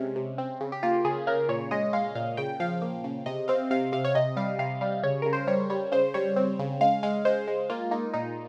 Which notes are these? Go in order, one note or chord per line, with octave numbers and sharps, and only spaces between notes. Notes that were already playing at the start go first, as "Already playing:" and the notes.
Already playing: C3 G#3 C#4
C3
C4
C#3
G4
A#3 F4
C#3 G#4
C#3 A#4
A#2 C#5
G#3 D#5
G#3 F5
A#2 F5
C#3 G5
F3 F5
A#3
C#3
C3 D#5
C4 F5
C3 F5
C3 F5
C#5
C3 D#5
G3 F5
C3 F5
G3 F5
C#3 C#5
C#3 A#4
C5
G3 C#5
G3 C#5
C#3 C5
G3 C#5
C4
C#3
G#3 F5
G#3 F5
G#3 C5
G#3
A#3 F4
A#3 D#4
A#2 D#4